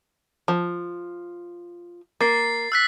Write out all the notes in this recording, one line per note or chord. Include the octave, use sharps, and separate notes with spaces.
F3
A#3 A6 C7
E6 F#6 B6